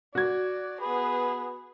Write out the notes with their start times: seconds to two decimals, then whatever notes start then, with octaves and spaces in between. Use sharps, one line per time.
0.15 F#4 D5 G#6
0.81 B3 G#4 B4